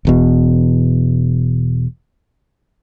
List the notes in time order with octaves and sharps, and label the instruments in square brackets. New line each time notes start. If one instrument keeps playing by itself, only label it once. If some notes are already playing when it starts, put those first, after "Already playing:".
[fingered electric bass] E1 E2 B2